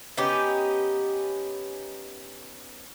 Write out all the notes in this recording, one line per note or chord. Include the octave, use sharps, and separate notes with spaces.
B3 C#4 D#4 G4